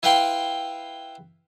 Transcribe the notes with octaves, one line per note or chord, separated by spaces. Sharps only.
E4 B4 F5 G5 B5 C6